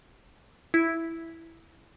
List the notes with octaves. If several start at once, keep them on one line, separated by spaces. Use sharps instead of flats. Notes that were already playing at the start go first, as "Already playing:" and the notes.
E4